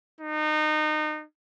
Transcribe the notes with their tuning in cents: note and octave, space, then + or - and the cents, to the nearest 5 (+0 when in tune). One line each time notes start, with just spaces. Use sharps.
D#4 -25